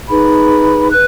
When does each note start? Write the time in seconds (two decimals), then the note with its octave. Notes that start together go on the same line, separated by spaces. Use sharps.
0.10 D#4 G#4 B4 B5
0.91 B4 F#6